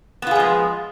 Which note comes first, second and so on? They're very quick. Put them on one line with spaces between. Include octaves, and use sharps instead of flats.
B3 F4 G#4 G#3 F3